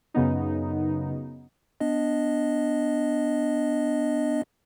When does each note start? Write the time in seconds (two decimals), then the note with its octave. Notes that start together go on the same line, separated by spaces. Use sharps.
0.14 F#2 C#3 B3 D#4
1.80 B3 D4 D#5